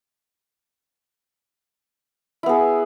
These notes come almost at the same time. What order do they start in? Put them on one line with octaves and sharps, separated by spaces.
E4 B3 G#4